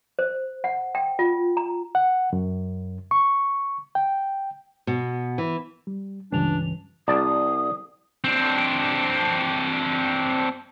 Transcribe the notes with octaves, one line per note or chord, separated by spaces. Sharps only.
C5
F#5
G5
F4
A#5
F#5
F#2
C#6
G5
B2
E3
G3
C#2 G2 E3 C#4 D4 F7
C2 D5 A5 D#6
C4 D4